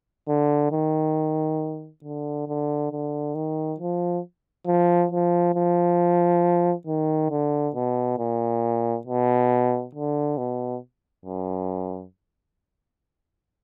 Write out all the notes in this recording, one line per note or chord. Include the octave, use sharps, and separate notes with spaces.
D3
D#3
D3
D3
D3
D#3
F3
F3
F3
F3
D#3
D3
B2
A#2
B2
D3
B2
F#2